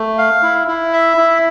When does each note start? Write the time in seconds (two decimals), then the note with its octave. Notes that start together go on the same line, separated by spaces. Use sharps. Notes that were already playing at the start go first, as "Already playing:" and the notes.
Already playing: A3
0.18 F5
0.43 E4
0.68 E4
0.93 E5
1.18 E4